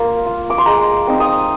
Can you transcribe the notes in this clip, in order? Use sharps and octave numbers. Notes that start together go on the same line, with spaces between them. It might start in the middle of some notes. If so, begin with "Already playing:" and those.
Already playing: A#3 F4
F4
D6
C6
G#3 A#5
C4 D#4
D#6